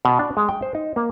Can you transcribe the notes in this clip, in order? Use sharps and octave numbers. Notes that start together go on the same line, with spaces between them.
B2
D4
G#3
G5
C5
D#4
A#3